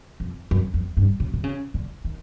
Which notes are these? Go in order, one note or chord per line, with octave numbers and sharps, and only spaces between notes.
F2
F#2
F2
G2
C#3
D3
C#3
D3
D#3